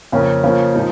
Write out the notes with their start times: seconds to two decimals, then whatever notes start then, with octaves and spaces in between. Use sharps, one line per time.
0.12 F2 C#3 A#3 C#4
0.43 C#3 F3 A#3 C#4
0.74 A#2 F3 G#3 D#4